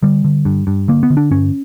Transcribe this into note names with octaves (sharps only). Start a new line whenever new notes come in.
D3 G3
D3
G2
G2
D3 A#3
B3
D3
D4
G2 C#4